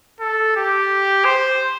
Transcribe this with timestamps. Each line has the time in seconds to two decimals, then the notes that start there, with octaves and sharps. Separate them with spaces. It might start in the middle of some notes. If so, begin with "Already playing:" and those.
0.20 A4
0.56 G4
1.25 C5